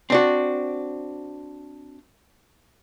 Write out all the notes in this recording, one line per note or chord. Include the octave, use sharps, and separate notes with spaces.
C4 D4 F#4